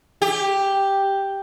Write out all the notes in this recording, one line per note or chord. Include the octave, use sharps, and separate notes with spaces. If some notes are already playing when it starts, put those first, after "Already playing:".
G4